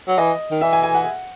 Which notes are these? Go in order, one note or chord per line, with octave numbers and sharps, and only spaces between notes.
F#3
E3 D#5
D#3
E3 E5
G#5
G#5
F#5